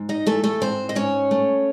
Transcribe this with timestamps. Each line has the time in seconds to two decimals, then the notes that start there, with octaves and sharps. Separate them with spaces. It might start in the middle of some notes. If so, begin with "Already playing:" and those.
Already playing: G#2
0.09 D#4 D#5
0.27 E3 A3 A4
0.44 A3 A4
0.61 G#2 C4 C5
0.89 D#5
0.95 G#2 C#4 C#5
1.31 A3